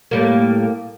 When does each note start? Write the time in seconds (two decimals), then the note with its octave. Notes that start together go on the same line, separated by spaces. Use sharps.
0.11 A2 G3 A#3